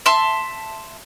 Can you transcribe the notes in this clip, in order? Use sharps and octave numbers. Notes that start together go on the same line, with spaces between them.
E5 A5 C6